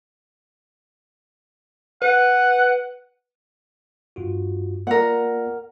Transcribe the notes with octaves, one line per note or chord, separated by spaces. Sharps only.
B4 F#5
G2 F4 F#4
A#3 F4 A#4 D5 F#5